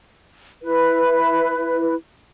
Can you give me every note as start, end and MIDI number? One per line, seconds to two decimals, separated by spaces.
0.63 1.94 64
0.63 1.94 71